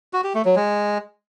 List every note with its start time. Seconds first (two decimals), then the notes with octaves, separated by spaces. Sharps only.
0.13 F#4
0.24 G4
0.34 A3
0.45 F#3
0.56 G#3